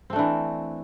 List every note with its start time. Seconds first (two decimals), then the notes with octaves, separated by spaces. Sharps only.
0.10 C4
0.13 A3
0.16 D4
0.19 E3